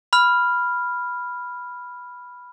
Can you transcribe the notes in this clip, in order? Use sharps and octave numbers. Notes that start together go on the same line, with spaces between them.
B5 F6